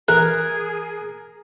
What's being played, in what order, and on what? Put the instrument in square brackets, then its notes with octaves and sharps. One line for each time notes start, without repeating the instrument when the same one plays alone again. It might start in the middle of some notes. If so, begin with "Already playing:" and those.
[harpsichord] E3 [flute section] G#4 [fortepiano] A#4 [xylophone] F#6